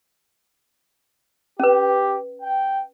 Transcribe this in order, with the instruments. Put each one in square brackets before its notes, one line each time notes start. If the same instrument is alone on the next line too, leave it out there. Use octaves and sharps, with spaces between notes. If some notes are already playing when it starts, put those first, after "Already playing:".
[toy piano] C#4 B4 [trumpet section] G4
[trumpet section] G5